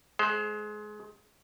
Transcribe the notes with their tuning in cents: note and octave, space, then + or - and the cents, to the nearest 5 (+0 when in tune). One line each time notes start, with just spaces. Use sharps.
G#3 +25 C5 +0